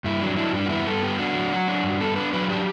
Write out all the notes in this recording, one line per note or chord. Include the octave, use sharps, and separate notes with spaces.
G2 E4
F#3 D4
D4 E4
G2 D4
F#4
B3 E4
G2 A4
B3 G4
D4 F#4
F#3
F#3
D4
G2
B3 A4
D4 B4
F#3 B4
D4 G4